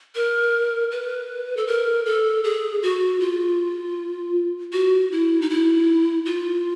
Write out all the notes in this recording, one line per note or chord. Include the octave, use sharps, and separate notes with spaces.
A#4
B4
A4
A#4
A4
G#4
F#4
F4
F#4
E4
D#4
E4
F4